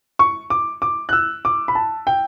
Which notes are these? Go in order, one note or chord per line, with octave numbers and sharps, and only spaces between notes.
C#6
D6
D6
F#6
E6
D6
B5
A5
G5